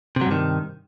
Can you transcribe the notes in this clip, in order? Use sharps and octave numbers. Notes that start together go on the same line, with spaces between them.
G2 C3 D#3 F#3